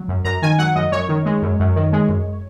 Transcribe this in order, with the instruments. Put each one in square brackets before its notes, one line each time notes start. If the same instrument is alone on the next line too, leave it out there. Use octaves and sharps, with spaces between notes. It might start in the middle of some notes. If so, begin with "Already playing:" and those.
Already playing: [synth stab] F#3
F#2
F#2 A#5
D#3 G#5
F#3 F#5
F#2 D#5
F#2 C#5
D#3
G#3
F#2
F#2
D#3
G#3
F#2